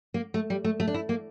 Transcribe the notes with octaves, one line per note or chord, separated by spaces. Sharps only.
A#3
A3
G3
A3
A3
D4
E4
A#3